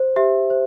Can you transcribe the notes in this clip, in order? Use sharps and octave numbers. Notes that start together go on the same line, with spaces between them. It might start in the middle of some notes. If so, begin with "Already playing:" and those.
Already playing: C5
G4 E5
C5